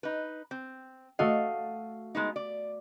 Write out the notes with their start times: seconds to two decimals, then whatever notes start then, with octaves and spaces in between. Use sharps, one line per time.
0.03 D#4 B4
0.51 C4
1.19 A3 F#4 D#5 F5
2.15 G#3 B3 D#4
2.36 D5